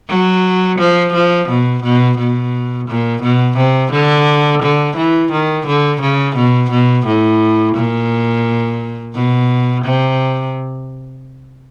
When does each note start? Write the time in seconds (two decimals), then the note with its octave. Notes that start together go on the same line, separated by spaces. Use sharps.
0.09 F#3
0.79 F3
1.13 F3
1.49 B2
1.83 B2
2.18 B2
2.88 A#2
3.23 B2
3.57 C3
3.92 D3
4.62 D3
4.97 E3
5.32 D#3
5.67 D3
6.01 C#3
6.36 B2
6.71 B2
7.06 A2
7.75 A#2
9.15 B2
9.85 C3